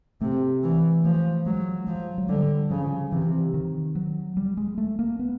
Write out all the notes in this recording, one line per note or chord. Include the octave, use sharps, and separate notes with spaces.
C3 A3
E3
F3 A3
F#3 G#3
F3 G#3
F#3
D3 G3
C#3 F3
C3 E3
D#3
F#3
G3
G#3
A3
A#3
B3